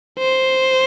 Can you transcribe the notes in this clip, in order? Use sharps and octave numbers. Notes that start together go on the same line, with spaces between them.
C5